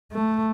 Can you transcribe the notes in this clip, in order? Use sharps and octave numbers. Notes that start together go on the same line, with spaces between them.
A3